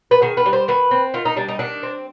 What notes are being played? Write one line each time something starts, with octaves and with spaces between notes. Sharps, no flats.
B4
D#3 G#4
B4
G3
C5
D#3 B4
C4
D#3 F4
D#4
G3 D4
D#4
D#3 D4
C4